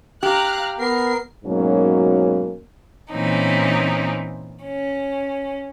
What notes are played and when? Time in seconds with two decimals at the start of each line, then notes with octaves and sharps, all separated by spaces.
0.23 G4 F5 A#5 F#6
0.79 B3 A#4 C7
1.45 G#2 B2 F#3 A#3 C#4
3.11 A#2 E3 C4 C#4 D#4
4.65 C#4